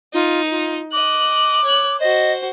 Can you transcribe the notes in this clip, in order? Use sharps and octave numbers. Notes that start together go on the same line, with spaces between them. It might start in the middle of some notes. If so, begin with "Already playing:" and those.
D#4 F4
F4
D#5 D6 F#6
C#5 F#6
F#4 C5 D#5